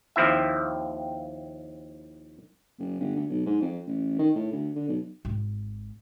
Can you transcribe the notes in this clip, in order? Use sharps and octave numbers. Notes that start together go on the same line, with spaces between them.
D#2 F3 C4 E4 E5
F#1
G1
D2
B1
G#2
F2
A1
D#3
A2
D2
D3
B1
G#1